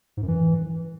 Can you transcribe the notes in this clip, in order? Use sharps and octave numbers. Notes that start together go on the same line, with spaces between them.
G#2
F#2
E3